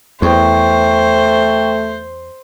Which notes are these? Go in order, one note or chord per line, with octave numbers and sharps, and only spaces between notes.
E2 A3 C5 G5 C#6